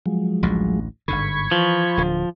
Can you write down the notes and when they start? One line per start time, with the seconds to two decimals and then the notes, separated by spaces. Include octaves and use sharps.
0.06 F3 F#3 G#3
0.43 A1 D2 A2
1.08 G1 G#2 D3 B5 C#6 G#6
1.51 E3 F3
1.97 D1 D3